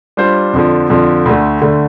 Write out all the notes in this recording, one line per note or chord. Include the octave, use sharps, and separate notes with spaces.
G3 D4 F4 C5
F2 D3 F3
F2 D3 F3
D2 D3 A3
D2 D3 A3